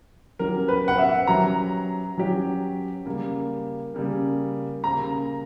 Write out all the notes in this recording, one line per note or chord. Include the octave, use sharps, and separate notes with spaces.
F#3 C#4 G4 A#4
B4
F#5
E5
F#3 C#4 G4 A#5
F#3 C#4 G4
C#3 G3 A#3
C#3 G3 A#3
C#3 G3 A#3 A#5